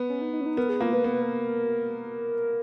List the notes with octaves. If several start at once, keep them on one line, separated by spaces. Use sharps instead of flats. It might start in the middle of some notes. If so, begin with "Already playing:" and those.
Already playing: B3
C#4
D#4
D#4
C#4
D#4
B3 A#4
G#4
A#3 F4
B4
B3 A#4
B4
A#4